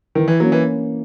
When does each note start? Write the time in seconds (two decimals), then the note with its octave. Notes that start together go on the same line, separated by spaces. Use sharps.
0.15 D#3 E3
0.28 E3
0.40 F#3 A#3
0.44 C#4
0.52 E3